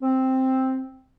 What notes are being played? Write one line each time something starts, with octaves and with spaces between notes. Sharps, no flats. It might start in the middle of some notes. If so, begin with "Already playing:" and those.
C4